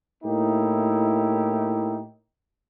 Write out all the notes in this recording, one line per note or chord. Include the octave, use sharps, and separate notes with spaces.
A2 A#3 D#4 E4 G4